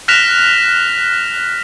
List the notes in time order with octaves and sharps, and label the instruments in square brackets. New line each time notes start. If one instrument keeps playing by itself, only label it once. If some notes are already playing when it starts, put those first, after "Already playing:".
[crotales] F6 F#6 A#6 B6 E7 F7